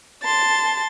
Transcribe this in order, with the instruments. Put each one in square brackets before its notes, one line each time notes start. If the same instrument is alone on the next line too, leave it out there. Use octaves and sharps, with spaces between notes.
[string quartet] A5 C6 [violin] A6